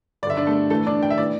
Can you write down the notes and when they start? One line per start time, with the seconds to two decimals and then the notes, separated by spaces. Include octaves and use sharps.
0.23 G2 D5
0.27 D3 E5
0.37 D4 D5
0.46 A3 A4
0.70 A2 E3 A3 A4
0.86 D4 D5
1.03 G5
1.10 E5
1.18 A2 E3 D5